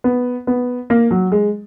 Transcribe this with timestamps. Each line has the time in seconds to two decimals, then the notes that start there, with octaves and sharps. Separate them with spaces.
0.04 B3
0.47 B3
0.90 A#3
1.11 F#3
1.32 G#3